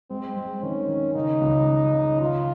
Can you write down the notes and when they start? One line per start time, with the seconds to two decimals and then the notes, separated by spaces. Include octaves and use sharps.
0.10 G#3 C4
0.37 G#3
0.63 D#3 C#4
0.89 D#3
1.15 C#3 D#4
1.41 C#2
1.68 C#3
1.93 C#3
2.20 D#3 F4